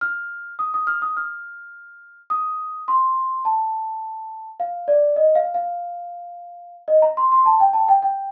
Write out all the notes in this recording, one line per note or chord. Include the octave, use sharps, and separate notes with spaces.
F6
D#6
D#6
F6
D#6
F6
D#6
C6
A5
F5
D5
D#5
F5
F5
D#5
A#5
C6
C6
A5
G5
A5
G5
G5